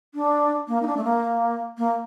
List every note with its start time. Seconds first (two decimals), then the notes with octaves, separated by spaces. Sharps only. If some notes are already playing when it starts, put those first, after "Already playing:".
0.15 D4
0.68 A#3
0.82 D#4
0.87 D4
0.97 A3
1.04 A#3
1.78 A#3